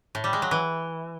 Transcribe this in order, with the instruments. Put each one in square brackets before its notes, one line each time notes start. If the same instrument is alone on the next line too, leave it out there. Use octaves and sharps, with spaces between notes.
[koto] A2
G3
G#3
F#3
E3